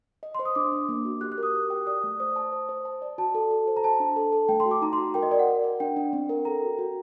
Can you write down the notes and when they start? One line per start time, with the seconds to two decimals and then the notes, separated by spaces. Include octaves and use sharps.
0.23 D#5
0.35 C5 C6
0.45 D#6
0.55 D4 D6
0.72 D4
0.89 A#3
1.05 F#4
1.21 G4 F#6
1.32 F#6
1.38 A#4 D#6
1.54 G4
1.70 G5
1.87 D5 D#6
2.04 A3
2.20 C5 D#6
2.36 A5
2.52 C5
2.69 C5
2.85 A5
3.02 D5
3.18 F#4 A5
3.35 A4
3.51 A4
3.67 C5
3.77 A#5
3.83 C5 A5
4.00 D4
4.16 A4
4.32 A4
4.49 A3 G5
4.60 C6
4.65 F#4
4.71 D6
4.82 D#4 A#5
4.93 C6
4.98 F#4
5.14 A#4 G5
5.23 D#5
5.31 A#4 D5
5.39 F#5
5.47 D5
5.64 D5
5.80 D4 G5
5.96 D4
6.13 C4
6.29 A#4
6.45 A4 A#5
6.62 F#4
6.79 F#4